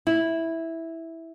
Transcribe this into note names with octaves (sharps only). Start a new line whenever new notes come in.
E4